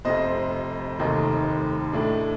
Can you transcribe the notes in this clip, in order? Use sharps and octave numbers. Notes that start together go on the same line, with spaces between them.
F1 F2 C3 C5 D#5
F1 D#2 D#3 A3 D#4
A2 A3 D4